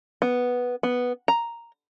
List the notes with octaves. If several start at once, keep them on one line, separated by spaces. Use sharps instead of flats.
B3
B3
A#5